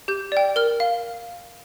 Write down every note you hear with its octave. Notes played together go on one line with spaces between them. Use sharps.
G4 G6
D5 G5
A#4 F6
F5